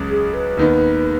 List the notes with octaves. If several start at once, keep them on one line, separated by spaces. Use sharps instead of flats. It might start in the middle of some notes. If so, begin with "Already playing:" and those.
Already playing: C#2 C#3 F#3
G#4
B4
D#2 D#3 B3